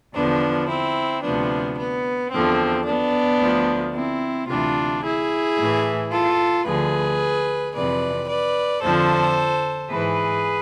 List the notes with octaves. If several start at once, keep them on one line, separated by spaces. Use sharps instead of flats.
E2 D3 F3 B3 D4
C4 E4
D2 C3 F3 B3 D4
B3
E2 D3 F3 C4
B3 D4
D2 D3 F3
C4 E4
D2 C3 E3 D4 F4
E4 G#4
A2 E3
F4 A4
D2 D3 F3 G#4 B4
F2 C3 E3 B4 D5
B4 D5
F2 D3 F3 A4 C5
G#2 E3 G#4 B4